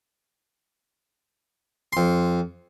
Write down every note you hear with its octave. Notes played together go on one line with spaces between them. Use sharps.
F2 C6